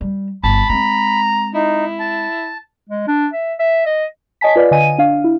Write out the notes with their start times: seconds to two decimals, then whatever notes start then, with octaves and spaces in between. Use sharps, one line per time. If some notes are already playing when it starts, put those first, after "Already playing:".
0.01 G3
0.44 G1 A5 B5
0.69 G#3 C4 A#5
1.54 D#4 E4
2.00 A5
2.89 G#3
3.07 D4
3.33 E5
3.59 E5
3.86 D#5
4.41 C#5 D#5 G#5 A5 B6
4.56 F4 B4 D5 F5
4.71 D3 D#5 G#5 D#7
4.98 D4 F5
5.24 E4